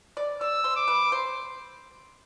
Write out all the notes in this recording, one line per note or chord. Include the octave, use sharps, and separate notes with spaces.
D5
D5 E6
C5
D6
B4
C5